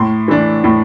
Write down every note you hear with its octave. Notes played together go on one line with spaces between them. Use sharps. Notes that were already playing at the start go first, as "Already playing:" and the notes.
Already playing: A2 C6
E3 A3 D4
A2